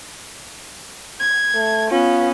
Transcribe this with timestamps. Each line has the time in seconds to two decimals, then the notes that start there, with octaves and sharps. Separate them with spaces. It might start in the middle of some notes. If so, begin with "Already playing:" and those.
1.20 G#6
1.54 A3
1.91 B3 C#4 F4